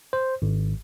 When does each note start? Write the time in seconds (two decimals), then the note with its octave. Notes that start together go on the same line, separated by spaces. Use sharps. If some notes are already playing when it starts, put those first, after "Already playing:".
0.13 C5
0.42 G#1